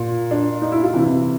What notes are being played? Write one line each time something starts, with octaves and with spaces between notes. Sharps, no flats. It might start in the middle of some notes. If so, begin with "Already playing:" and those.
Already playing: A#2
D4
D#4
E4
F4
C3 E3